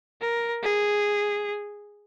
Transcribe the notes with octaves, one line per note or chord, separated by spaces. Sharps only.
A#4
G#4